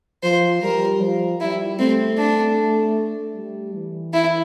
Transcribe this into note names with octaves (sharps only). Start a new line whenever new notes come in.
F3 C5
G3 A#4
F3
G3 E4
A3 C4
D4
G3
E3
E4